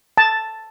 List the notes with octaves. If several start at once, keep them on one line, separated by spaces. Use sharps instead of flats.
A5